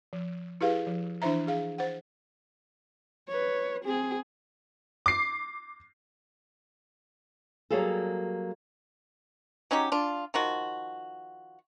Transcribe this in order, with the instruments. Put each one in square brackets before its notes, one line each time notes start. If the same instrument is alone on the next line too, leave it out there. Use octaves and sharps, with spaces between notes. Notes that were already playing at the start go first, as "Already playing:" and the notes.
[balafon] F3
E4 G4 G#4 B4 F5
F3
E3 D4 E4 C5 E5 A#5
G#4 F5
C5 F#5
[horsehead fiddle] B4 C#5
C4 G#4
[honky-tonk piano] D6 C7
[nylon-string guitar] F#3 G3 A#3 G#4 A4
[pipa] F#3 C#4 D#4 G4
D4 F4
D#3 F3 F#4